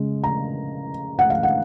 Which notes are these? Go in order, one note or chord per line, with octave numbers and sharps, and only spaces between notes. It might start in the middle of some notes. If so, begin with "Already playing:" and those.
Already playing: C#3 G#3
A#5
F#5
F5
F#5